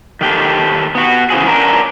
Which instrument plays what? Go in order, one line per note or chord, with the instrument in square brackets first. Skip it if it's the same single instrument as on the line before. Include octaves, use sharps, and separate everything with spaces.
[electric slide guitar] D#3 G4 A4
B3 F#4
C#3 E3 F3 G#4
C#4 D4 A#4